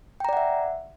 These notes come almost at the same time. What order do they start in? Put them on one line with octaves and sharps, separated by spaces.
G5 A#5 D5 F#5 E5